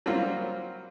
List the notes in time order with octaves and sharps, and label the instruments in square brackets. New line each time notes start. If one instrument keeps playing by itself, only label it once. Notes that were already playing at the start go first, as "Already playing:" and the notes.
[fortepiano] F#3 G3 A#3 C4 F4